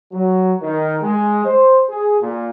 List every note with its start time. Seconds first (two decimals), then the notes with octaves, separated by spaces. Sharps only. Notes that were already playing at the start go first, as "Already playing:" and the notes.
0.12 F#3
0.61 D#3
1.03 G#3
1.45 C5
1.90 G#4
2.21 A#2